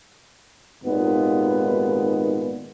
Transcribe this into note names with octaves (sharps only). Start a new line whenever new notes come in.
G#1 D#2 A#2 G#3 B3